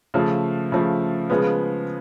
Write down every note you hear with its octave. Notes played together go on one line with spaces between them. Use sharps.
C#3 F3 A3
C#3 F3 A3
C#3 F3 G#3 B3